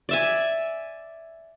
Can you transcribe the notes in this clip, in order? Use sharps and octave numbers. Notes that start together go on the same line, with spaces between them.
D5 E5 G#5